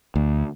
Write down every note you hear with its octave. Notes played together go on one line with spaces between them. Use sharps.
D2